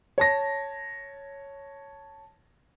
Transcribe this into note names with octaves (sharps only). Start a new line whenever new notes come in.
C#5 A5 A#6